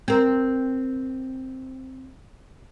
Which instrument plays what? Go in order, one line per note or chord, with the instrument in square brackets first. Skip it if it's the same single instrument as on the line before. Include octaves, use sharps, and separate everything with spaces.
[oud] C4 A#4